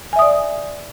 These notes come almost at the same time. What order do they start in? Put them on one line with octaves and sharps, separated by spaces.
G#5 E5 D#6 D5